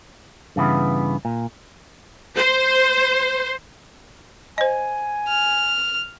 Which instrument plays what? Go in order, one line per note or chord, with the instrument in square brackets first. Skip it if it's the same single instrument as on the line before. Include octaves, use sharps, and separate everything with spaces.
[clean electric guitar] G2 C#3 E3 B3
A#2
[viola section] C5
[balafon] C5 D#5 [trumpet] G#5
[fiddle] F6